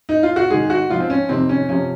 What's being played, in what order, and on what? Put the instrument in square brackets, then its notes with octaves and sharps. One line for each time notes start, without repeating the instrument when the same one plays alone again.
[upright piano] D#4
F4
F#4
G#2 D#3 G#4
F#4
G#2 F3 F4
C4
C#4
F2 C3 D#3 C4
C#4
F2 C3 F3 C#4